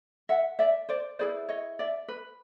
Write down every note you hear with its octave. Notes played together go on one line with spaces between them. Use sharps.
E5 F#5
D5 E5
C5 D5
E4 G#4 B4 C5 D5
C#5 D#5
D5 E5
B4